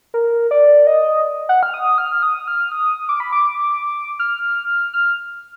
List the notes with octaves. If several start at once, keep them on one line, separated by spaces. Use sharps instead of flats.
A#4
D5
D#5
F#5
F6
D#6
F6
D#6
F6
D#6
D6
B5
D6
F6
F6